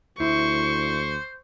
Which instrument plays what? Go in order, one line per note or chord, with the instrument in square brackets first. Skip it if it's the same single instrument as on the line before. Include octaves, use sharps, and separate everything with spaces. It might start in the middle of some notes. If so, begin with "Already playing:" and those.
[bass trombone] D2 [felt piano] E4 [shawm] C5 [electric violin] C#6